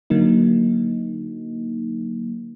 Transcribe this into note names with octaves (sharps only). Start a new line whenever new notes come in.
D3 F#3 A#3 D#4